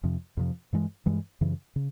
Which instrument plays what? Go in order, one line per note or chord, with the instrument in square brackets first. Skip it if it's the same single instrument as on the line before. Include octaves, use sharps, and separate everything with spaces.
[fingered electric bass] F2 C3 F3
F2 C3 F3
G2 E3 G#3
G2 E3 G#3
F#2 C#3 E3
C#3